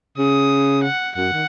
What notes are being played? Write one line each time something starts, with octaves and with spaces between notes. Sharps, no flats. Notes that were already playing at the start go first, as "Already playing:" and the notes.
C#3 D#6
F#5
F#2 F#5
D#3